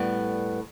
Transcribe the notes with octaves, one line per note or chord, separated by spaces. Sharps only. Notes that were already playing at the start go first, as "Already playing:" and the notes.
Already playing: A2 G3 B3